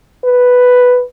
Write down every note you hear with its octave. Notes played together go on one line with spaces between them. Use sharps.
B4